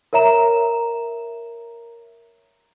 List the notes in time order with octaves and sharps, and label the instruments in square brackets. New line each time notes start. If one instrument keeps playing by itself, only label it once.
[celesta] A#4 C#5 E5 A#5 E7